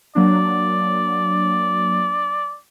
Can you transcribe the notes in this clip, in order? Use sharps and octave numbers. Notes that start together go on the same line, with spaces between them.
F#3 A#3 D4 D5